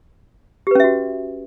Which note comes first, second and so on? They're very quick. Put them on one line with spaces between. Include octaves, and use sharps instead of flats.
G4 B4 C#4 E5 F#4